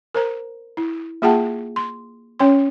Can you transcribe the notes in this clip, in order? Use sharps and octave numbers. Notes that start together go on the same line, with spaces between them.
A#4 C5 A#5
E4
A#3 F4 G#4 F#5 G5 A5
C6
C#4 C#5 C6